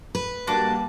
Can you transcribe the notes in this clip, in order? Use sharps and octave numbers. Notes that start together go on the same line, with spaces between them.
B4
G3 A#3 D4 F#4 A5 D6